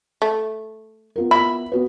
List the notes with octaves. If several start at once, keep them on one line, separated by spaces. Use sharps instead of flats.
A3
B3 F4 A#4
E4 B5
B3 F#4 B4